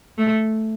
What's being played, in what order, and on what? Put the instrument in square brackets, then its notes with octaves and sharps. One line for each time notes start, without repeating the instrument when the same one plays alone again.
[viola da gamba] A3